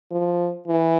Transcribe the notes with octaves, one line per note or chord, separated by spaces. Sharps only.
F3
E3